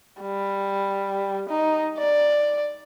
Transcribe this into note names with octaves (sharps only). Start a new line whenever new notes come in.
G3
D#4
D5